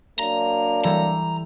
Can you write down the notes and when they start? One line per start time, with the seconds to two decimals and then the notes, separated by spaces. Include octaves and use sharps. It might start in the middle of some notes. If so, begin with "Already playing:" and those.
0.19 F#3 A#3 D4 A#5
0.84 E3 G3 A4 A#5